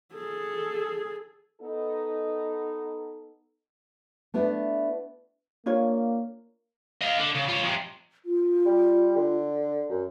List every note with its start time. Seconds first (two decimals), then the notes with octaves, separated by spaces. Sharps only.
0.14 G#4 A4
1.61 B3 D#4 A4
4.34 A3 B3 D4 E4
5.66 A#3 D4 F4 C#5
7.01 D#5 F5
7.19 D3
7.35 C#3
7.48 F4 C#5
7.63 F2 C3
8.25 F4
8.66 G3
9.16 D3
9.89 F#2